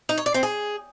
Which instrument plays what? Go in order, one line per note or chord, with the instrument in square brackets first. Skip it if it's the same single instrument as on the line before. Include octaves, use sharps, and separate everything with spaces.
[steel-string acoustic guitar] D#4
C#5
D5
C4
G#4